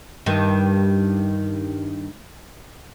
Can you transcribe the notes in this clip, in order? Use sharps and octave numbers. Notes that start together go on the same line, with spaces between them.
G2 D#3